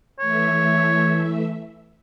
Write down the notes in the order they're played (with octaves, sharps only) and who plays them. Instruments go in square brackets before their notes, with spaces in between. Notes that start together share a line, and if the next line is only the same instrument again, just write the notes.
[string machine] E3 A3 E5 [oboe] C#5